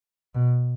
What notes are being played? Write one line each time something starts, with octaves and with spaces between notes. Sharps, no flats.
B2